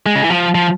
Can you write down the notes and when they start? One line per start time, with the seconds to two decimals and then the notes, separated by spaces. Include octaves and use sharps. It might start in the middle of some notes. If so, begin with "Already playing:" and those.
0.06 G#3
0.15 C#3
0.24 E3
0.30 F3
0.55 F3